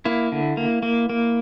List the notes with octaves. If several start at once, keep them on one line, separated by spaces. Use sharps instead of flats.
A#3 E4
D3
A#3
A#3
A#3